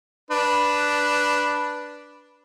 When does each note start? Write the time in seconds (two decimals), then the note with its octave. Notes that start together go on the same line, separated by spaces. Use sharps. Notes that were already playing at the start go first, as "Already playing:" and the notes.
0.31 D4 B4